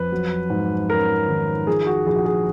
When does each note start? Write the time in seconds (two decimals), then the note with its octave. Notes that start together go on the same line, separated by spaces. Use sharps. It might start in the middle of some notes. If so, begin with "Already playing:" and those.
Already playing: F2 B4
0.12 F#3
0.50 G#2
0.90 C#4 A#4
1.28 D#3
1.67 F3 G#4
1.87 F#4
2.06 A#1 G#4
2.16 F#4
2.26 G#4